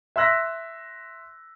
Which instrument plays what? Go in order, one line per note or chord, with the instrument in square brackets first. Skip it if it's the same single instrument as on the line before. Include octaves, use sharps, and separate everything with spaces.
[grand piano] E5 C6 E6 F#6 A#6 B6